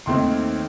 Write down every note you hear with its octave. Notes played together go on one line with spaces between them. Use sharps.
D#2 D#3 A3 C4 D#4 C6